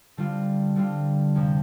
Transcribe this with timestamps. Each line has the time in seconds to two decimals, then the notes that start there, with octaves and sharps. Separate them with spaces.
0.17 D3 G3 C4 F4
0.76 D3 G3 C4 F4
1.35 F2 C3 F3 C4